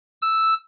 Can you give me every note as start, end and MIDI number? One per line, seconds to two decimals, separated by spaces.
0.22 0.54 88